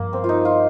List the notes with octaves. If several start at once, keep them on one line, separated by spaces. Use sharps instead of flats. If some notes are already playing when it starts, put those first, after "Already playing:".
Already playing: G2 F3 A#3
C4
F4
D#4
F4